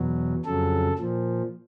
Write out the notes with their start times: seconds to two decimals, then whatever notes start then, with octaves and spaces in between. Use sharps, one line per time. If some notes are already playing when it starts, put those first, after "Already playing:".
Already playing: E2 B2 F#3
0.45 F2 C#3 F#3 A4
0.98 A#2 F3